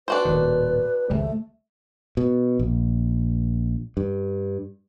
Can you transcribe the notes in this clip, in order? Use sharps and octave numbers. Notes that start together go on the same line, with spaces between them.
D4 F#4 B4 C5
D#1 A2 D#3
G#1 C#2 G3 A3
B2
A#1
G2